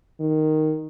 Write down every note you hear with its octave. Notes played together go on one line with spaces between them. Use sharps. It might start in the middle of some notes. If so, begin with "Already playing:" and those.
D#3